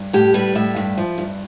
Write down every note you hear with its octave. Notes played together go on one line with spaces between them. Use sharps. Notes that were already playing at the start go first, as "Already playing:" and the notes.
Already playing: G2
A2 G4
G3 B4
A2 E5
G2
F3
G2